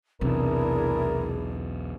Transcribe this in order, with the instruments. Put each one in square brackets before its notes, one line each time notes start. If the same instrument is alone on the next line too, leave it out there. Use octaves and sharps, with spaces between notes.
[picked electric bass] B1 E2 [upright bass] C3 [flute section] D4 E4 G#4 [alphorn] A#4